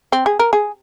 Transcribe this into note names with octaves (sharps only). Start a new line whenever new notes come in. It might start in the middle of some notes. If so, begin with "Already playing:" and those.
C4
G#4
A#4
G#4